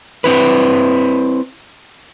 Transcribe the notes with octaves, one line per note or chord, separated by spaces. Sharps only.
C4 E4 B4